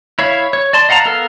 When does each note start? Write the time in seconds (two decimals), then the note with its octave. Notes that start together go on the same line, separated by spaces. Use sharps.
0.19 E4 C#5 F5
0.53 C#5
0.73 D5 A5 C6
0.89 D#5 F5 F#5 A5 A#5
1.05 B3 A4 A#4 F5